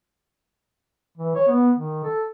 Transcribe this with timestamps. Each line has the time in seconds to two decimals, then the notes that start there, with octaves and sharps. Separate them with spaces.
1.18 E3
1.35 C#5
1.47 B3
1.76 D#3
2.04 A4